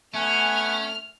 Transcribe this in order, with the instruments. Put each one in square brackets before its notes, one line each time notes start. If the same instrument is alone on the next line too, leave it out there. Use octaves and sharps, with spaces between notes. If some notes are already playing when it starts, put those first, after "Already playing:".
[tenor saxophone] A3 [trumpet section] B3 F#5 G#5 [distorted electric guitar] C#4 [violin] F6